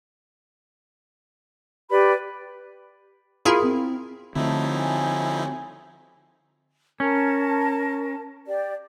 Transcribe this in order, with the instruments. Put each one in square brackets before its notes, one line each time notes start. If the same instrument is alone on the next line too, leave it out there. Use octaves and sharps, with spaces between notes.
[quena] G4 [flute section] B4 D5 B5
[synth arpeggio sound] E4 G#4 A#4 [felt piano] F4 C6
[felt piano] C4
[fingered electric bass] D3 C4 [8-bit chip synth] F3 D#4 E4 [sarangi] A3
[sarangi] G#5
[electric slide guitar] C#4 [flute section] A#4 A5
[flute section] G4 D5